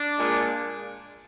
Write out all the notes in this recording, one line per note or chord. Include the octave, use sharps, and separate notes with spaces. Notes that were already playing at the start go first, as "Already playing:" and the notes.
Already playing: D4
A#2 G#3